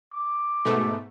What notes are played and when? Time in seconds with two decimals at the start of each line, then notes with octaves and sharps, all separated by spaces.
0.14 D6
0.65 G#2 B2 A3